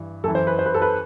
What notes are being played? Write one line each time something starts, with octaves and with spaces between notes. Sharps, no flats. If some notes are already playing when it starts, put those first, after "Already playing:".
Already playing: G2 E3
F#2 E3 A4
C5
B4
C5
B4
A4
B4